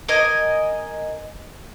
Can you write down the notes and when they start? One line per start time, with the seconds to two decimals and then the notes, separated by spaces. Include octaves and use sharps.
0.09 A#4 D#5 G#5